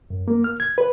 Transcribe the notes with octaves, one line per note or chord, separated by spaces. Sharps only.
F#2
A#3
F6
G#6
B4